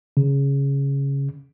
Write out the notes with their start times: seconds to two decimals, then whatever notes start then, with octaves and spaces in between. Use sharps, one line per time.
0.17 C#3